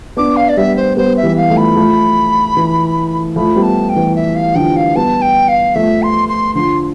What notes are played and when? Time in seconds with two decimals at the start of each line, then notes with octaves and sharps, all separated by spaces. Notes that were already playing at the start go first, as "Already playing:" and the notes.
0.17 B3 D4 D6
0.36 F5
0.49 D5
0.57 G3 B3 E5
0.77 C5
0.97 G3 B3 C5
1.17 E5
1.23 E3 G3
1.37 F5
1.50 F3 A3
1.57 B5
1.76 F3 A3
2.57 E3
3.36 F3 A3 B5
3.56 G3 B3
3.63 A5
3.89 G5
3.96 E3
4.15 E5
4.36 F5
4.55 D3 F3 G5
4.76 F5
4.95 G3 B3 A5
5.22 G5
5.48 F5
5.75 F3 A3 E5
6.03 C6
6.29 C6
6.55 D3 F3 C6